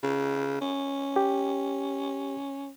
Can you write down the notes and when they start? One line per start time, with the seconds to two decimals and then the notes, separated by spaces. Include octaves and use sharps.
0.03 C#3
0.61 C#4
1.16 G4